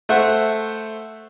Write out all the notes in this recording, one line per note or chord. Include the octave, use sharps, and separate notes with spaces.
A3 C5 E5 F#5